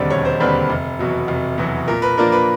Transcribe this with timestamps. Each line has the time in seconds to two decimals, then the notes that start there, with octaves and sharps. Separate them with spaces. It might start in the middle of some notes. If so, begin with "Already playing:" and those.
Already playing: E1 D#2 D3 G3 C4 D5
0.10 E1 C#5
0.25 C5
0.40 D#2 D3 G3 C4 B4
0.70 F1
0.99 E2 B2 F#3
1.28 F1
1.58 E2 B2 F#3
1.88 A#2 A#4
2.02 B4
2.18 F3 A#3 D4 A#4
2.32 B4